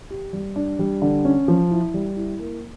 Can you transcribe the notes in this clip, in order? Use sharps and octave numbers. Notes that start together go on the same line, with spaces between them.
G4
G3
D4
G3
D3
C#4
F3
E4
G3
E4
A#3